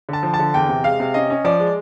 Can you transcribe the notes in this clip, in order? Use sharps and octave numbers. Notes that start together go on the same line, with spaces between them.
D3 A5
F3
A5
D3
E2 G5
C3
G#3 F5
C3
C#4 D#5
C#4
F3 D5
G#3